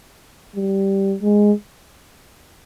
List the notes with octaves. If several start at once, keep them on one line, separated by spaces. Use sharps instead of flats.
G3
G#3